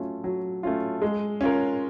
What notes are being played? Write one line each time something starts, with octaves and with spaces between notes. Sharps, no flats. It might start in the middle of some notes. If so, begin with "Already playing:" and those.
Already playing: F#3 A3 C#4 F4
F#3
A3 C#4 F4
G#3
C#4 F4 A#4